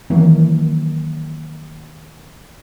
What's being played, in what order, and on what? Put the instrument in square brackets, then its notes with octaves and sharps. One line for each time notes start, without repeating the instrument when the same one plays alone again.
[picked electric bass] D#3 E3 F#3 A#3